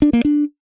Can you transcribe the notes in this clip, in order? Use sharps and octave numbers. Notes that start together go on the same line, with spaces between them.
D4
A#3
D4